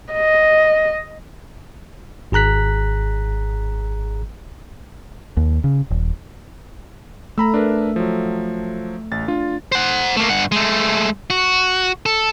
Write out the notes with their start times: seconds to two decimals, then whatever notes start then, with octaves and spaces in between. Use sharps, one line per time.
0.14 D#5
2.32 G#1 G#4 A#5 F#6 B6
5.37 D#2
5.64 C#3
5.90 D#1
7.38 A3 A#5 B5 E6
7.54 D4 A#4 B4
7.96 F3 F#3
9.12 A1 A6
9.28 D4 F4
9.72 C5 F#5
10.16 A3 A#3
10.29 G2 F#5
10.52 G#3 A3
11.30 F#4
12.06 A4